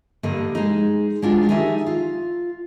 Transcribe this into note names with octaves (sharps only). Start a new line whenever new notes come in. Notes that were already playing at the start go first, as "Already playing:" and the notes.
G2 D3 G3 A#3 D#5
G#3 D#4
G#3 D4 F4 F#4
D#3 D#4 G4 G#4 D5 E5
F4